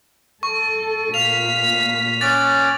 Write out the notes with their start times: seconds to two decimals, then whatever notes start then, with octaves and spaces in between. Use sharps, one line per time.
0.43 A4 C#6
1.14 A#2 F5 B6 F7
2.21 C#4 D6 F#6 A6